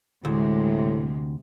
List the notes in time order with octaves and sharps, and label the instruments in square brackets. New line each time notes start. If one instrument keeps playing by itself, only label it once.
[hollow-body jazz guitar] D2 [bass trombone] A2 [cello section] C3 G#3